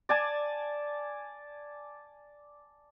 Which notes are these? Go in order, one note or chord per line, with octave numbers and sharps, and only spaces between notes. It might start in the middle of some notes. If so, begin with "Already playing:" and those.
D5 G#5 A5